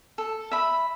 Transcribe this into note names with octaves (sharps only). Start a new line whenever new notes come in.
A4
E5 B5